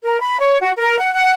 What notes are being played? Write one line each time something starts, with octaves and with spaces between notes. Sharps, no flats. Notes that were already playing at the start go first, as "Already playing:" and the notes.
A#4
B5
C#5
F#4
A#4
F#5
F#5